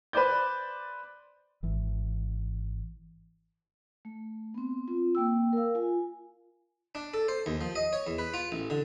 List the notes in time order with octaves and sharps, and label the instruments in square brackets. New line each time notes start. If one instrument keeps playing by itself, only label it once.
[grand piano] B4 C5 D5 G6
[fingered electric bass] G#1 E3
[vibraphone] A3
B3 C4
C4 F4
A#3 G5 E6
A#4 F5
F4 G#5
[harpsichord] D4
A4
C5
D#2
F3
D#5
C#5
E2
B4
F4
A1
D3